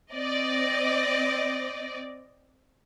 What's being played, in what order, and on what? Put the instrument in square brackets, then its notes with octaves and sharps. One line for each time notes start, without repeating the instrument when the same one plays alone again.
[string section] C4 D5 D#5